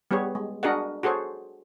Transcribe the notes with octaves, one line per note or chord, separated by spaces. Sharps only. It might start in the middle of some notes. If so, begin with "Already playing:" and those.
G3 B3 G4 G#4 C#5
G#3
D4 F#4 G#4 A#4 D#5 F#5
F#4 G#4 A4 C5 C#5